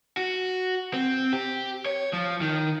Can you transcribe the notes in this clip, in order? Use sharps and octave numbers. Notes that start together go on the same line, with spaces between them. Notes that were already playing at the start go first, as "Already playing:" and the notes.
F#4
C4
G4
C#5
F3
D#3